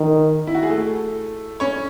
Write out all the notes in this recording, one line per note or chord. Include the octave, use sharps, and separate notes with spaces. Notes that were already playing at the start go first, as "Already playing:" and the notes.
Already playing: D#3
E4
F#4
G#4
A3 A4
C#4 C#5